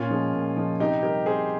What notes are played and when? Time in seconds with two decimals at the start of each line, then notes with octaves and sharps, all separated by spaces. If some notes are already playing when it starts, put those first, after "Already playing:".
Already playing: A#2 C#4 F4
0.10 F3 G#3
0.34 A#2
0.56 F3 G#3
0.80 C3 D#4 G4
1.03 G3 G4 A#4
1.26 C3 G#4 C5